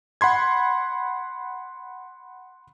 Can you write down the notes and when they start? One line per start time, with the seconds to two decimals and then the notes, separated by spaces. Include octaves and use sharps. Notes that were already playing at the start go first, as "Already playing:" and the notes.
0.21 F#5 B5 C6 G#6